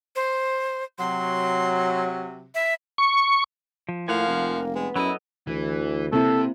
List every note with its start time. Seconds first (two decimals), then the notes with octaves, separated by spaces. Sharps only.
0.16 C5
0.99 C3 F#3 C6
2.55 E5
2.98 C#6
3.89 F3
4.08 A2 F3 A#3 F5 F#5 G#5
4.28 F1
4.75 G#3 B3
4.96 F#2 F#3 E4 A4 D#5
5.47 D2 E3
6.13 C3 A#3 C4 E4 A4